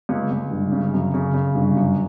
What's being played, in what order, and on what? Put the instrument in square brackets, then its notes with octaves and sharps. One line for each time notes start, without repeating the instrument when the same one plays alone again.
[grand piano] C#2
C#2
G1
C#3
F#2
C#3
C#3
G1
F#2